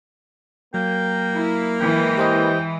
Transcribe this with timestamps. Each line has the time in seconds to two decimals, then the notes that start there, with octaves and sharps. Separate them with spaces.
0.74 F#3 A#3 G5
1.33 E4
1.80 E3 G#3 G5
2.17 G4 C5 D#5 G5